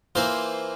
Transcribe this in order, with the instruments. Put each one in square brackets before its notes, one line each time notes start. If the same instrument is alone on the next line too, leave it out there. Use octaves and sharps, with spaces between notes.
[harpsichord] E3 A#3 F4 C5